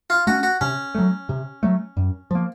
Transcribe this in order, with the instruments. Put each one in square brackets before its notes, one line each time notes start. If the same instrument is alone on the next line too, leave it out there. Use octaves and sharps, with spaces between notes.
[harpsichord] F4
[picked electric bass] A3 C#4 [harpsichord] F#4
[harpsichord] F#4
[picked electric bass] C3 [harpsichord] C#4
[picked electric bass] F#3 A3
C3
F#3 A3
F#2
F3 A#3